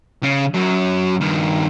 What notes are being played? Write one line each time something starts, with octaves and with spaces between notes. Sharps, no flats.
C#3
F#2 F#3
G2 D#3